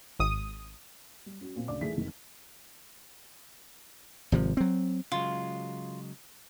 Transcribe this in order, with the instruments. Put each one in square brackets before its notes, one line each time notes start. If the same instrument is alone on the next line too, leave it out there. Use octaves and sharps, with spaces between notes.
[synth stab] G#1 D#6
[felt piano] G3
C#4 F#4
A#2 C4
D2 C#3 D5 D6
D#3 E3 A3 G#4 B6
F1 D#3
[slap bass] G#1 C3 F3
F#3 C4
[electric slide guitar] C#3 F#3 G#3 [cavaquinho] F4